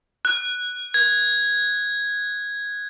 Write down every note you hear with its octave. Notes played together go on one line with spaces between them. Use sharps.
F#6
G#6